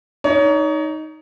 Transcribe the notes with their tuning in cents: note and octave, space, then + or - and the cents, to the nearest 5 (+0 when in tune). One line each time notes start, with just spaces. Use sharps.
D#4 +0 C#5 +30